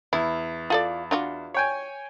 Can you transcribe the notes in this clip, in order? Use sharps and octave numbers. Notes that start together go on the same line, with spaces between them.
E2 E4
F4 A4 D5
D4 F4 F#4
C#5 G5 G#5